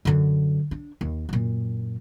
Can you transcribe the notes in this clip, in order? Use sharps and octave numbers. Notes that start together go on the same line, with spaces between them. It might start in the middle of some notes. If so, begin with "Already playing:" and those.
F#2 D3
D4
D#2
F#2 A#2